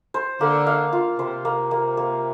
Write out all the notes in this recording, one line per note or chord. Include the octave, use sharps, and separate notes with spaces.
C5
D3 A#3
F5
F4
C3 C5
A#3
A#3
A#3